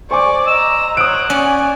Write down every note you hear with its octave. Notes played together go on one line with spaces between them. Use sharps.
C5 D5 G#5 C#6 D6
D#5 A#5 E6
C5 C#5 F#5 D#6 D7
C#4 D5 G#5